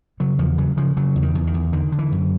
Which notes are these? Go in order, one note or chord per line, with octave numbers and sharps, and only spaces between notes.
C#3 F#3
E2 F3
C#3 F#3
C#3 F3
C#3 F#3
E2
D#3
E2
D#3
E2
D3 D#3
D3
E3
F#2